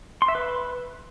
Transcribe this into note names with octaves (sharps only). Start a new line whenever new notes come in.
C6
E5
B4